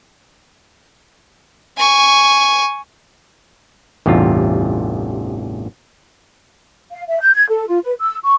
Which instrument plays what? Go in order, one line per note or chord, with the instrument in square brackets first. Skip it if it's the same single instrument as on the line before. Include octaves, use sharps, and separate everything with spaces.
[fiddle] G#5 C#6
[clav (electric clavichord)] A1 E2 G2 C3 F4
[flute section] F5
E5
G6
G#6
A4
F4
B4
E6
C#6